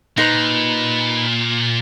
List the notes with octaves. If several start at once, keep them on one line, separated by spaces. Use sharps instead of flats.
A#2 D#4 B4 C5